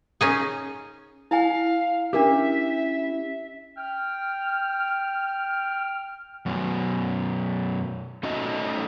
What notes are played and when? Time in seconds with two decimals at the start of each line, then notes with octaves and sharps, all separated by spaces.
0.21 C#4 D#4 G#4
1.31 E4 F5 G#5
2.13 C#4 D4 E4 G4 A#4 E5 D6
3.78 G5 F6
6.46 F#2 B2
8.23 A3 C#4 D#4 F#4 D#5